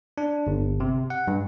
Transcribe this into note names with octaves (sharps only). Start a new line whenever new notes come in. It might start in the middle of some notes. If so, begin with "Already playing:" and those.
D4
G1
C3
F#5
G2